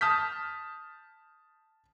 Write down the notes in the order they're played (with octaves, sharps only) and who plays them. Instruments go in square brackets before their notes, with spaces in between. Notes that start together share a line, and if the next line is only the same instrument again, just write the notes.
[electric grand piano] A5 D#6 F6 G6 B6